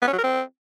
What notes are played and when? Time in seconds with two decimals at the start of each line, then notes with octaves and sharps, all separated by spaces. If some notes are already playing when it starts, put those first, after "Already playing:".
0.02 B3
0.07 C#4
0.13 F#3
0.18 A#4
0.24 C4